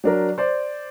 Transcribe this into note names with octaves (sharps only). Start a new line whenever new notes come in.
F#3 D4 A#4
C5 D5